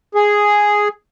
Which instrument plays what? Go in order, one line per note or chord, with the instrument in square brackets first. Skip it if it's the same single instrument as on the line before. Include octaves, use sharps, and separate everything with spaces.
[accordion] G#4